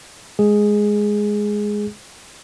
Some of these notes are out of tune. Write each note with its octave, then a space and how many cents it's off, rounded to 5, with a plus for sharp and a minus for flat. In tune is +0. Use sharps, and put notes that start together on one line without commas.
G#3 +0 G#4 +0